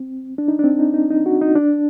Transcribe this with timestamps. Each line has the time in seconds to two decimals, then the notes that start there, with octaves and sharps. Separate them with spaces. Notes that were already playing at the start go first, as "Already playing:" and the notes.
Already playing: C4
0.38 D4
0.48 D#4
0.59 D4
0.64 C4
0.79 D#4
0.94 D#4
1.11 D#4
1.26 F#4
1.41 D#4
1.56 D4